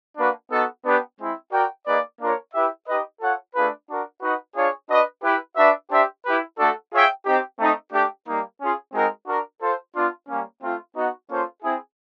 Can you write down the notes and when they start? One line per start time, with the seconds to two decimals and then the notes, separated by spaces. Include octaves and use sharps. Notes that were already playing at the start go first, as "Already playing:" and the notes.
0.17 A#3 D4 F#4 B4
0.51 B3 D#4 F#4 A4
0.85 B3 D4 G4 B4
1.19 G#3 C4 E4
1.52 F#4 A#4 D5 G5
1.86 A#3 D#4 G#4 B4 D5
2.20 A#3 D4 F4 A#4 C#5
2.53 E4 G4 B4 E5
2.87 D#4 G4 B4 D#5
3.20 F4 A4 C#5 F#5
3.54 A3 D4 F4 G#4 B4
3.88 D4 F#4 A#4
4.22 D#4 F#4 B4 D#5 F#5
4.56 D4 F4 G#4 C#5
4.89 D4 F#4 B4 D#5
5.23 E4 G4 B4
5.56 D4 F#4 B4 E5
5.90 D4 G4 C5 E5
6.24 E4 G4 B4
6.58 A3 D4 F#4 A4
6.91 F4 G#4 C#5 E5 G5
7.25 C4 D#4 G4
7.59 A3 C4 D#4
7.92 A3 D4 G4
8.26 G3 A#3 D#4
8.60 C#4 F4 G#4
8.94 G#3 C4 D#4 F#4 A#4
9.27 D4 F#4 A#4
9.61 F4 A4 C5
9.94 B3 D4 F4
10.28 G3 A#3 C#4
10.62 A3 C4 F4
10.96 B3 D#4 F#4
11.30 A#3 C#4 F4 A4 C5
11.63 C4 E4 G#4